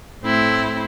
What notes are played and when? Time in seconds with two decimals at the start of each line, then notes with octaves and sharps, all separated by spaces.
0.22 A2 A3 C4 E4